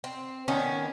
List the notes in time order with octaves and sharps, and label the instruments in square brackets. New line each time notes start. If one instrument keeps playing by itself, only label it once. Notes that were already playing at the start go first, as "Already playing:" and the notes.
[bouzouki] C4
[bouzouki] D#3 B3 [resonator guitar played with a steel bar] C#4